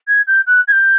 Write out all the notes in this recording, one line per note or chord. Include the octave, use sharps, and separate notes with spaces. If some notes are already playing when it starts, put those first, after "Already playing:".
G#6
G6
F#6
G#6
G6